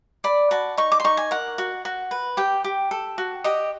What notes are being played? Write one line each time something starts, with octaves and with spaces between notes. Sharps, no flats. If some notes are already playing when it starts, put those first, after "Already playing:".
D5 B5
F#4 A5
D#4 C#6
D6
C6
D#4 C#6
G#5
A#4 F#5
F#4
F#4
B4
G4 G5
G4
A4
F#4
G4 D#5